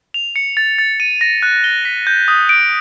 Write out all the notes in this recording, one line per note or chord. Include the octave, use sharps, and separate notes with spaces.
F7
C#7
A6
A6
D#7
A#6
F#6
G7
B6
G6
D#6
D7